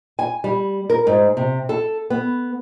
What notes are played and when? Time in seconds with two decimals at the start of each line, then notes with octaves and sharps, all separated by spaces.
0.19 G#5
0.44 G3
0.90 A#4
1.07 G#2
1.37 C3
1.69 A4
2.10 B3